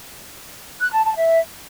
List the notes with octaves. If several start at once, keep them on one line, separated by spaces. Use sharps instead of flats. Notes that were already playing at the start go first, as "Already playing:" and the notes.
F#6
A5
A5
E5